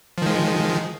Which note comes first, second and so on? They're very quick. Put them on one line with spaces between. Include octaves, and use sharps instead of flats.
F3 D#3 G#3